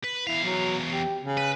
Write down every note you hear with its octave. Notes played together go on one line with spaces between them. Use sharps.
B4
E2 E4 F5
F#3
G4
C#3
B4